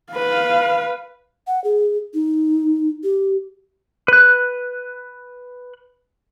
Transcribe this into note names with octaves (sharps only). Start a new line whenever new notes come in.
B4 F5
F#5
G#4
D#4
G4
B4 F#6